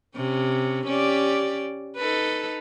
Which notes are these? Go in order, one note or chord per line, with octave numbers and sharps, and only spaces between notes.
C3 C#4
C#4 G4 D5
D#4 A4 B4